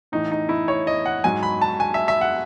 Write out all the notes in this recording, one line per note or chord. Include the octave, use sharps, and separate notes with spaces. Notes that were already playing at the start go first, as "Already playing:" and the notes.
A2 E3 D#4
D#4
E4
C#5
D#5
F#5
G#2 F#3 G#5
B5
A5
G#5
E5
E5
F#5